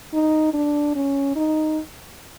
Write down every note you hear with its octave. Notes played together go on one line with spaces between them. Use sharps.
D#4
D4
C#4
D#4